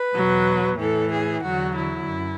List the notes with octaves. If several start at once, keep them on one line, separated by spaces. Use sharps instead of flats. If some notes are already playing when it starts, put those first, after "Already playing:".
Already playing: B4
E2 B2 F#3
A2 E3 A4
G#4
E2 D3 F#3 F#4
E4
F#2